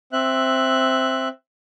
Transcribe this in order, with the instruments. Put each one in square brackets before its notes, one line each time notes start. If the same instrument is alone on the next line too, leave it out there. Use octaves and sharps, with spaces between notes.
[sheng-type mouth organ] C4 E5 F#6